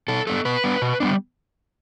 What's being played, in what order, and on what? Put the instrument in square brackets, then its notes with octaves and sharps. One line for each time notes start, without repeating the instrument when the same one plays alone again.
[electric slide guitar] B2 A4
G3 B3 D4 A4
B2 B4
G3 B3 D4
B2
G3 B3 D4